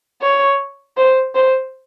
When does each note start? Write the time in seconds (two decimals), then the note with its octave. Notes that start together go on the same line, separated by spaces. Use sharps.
0.21 C#5
0.97 C5
1.35 C5